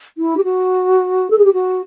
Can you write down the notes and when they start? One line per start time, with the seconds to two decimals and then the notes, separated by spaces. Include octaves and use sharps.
0.17 E4
0.37 G4
0.43 F#4
1.30 A4
1.38 G#4
1.44 G4
1.53 F#4